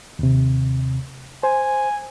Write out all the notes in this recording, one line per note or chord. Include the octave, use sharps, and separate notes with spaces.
D#2 C3
C5 G#5